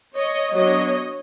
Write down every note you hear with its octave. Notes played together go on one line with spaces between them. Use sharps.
C#5 D#5
F#3 B3 D4 C#5 D#5